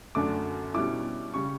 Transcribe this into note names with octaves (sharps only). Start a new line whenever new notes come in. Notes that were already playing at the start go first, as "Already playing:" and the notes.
F#2 D3 A3 D4 D6
B2 G3 C#4 E4 D6
C#3 G3 C#6